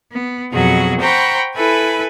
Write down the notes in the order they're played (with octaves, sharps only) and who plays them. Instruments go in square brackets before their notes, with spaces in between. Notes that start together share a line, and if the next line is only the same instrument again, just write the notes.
[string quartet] B3
F2 B2 F#3 F#4 G#4
C5 F#5 G5 A#5 B5 C#6
E4 A4 B4 G#5 B5